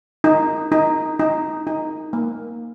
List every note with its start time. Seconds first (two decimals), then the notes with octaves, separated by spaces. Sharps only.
0.24 D#4
0.72 D#4
1.19 D#4
1.67 D#4
2.13 A#3